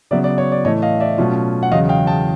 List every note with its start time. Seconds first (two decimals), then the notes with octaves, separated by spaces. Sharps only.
0.11 C#3 F#3 B3 D5 E5
0.24 D5
0.38 C#5
0.52 D5
0.65 A2 E3 A3 C#5 D#5
0.82 D#5 F5
1.00 D5 E5
1.18 B2 F#3 A3 C#4 F4
1.63 F#5
1.71 E2 C#3 F#3 D#5 F5
1.89 F5 G5
2.07 G5 A5